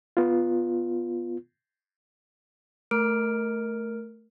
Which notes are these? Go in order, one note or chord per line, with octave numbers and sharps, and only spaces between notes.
B3 F4
A3 A#4 F6 D7